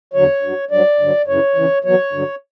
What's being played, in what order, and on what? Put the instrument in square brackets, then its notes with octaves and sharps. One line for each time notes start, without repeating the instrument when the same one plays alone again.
[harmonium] E2 D3 F#3 C#5
G2 F#3
G2 F#3 D5
G2 D3 F#3
F#2 C#3 E3 C#5
E2 C#3 E3
E2 B2 F#3 C#5
G2 D3 F#3